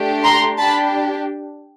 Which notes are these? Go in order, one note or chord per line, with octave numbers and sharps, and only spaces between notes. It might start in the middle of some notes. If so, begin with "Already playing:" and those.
Already playing: A3 D4 G4
A#5 C6
D4 G4 A5 B5